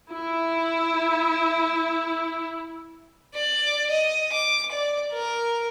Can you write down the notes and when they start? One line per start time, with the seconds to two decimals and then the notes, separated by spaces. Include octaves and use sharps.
0.12 E4 E5
3.34 D5
3.90 D#5
4.33 D6
4.72 D5
5.12 A#4